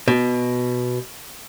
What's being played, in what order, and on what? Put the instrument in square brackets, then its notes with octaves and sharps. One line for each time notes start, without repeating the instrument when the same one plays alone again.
[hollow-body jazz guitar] B2